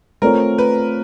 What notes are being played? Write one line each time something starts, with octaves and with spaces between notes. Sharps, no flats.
A3 C4 F4 A4 A#4 C#5
B4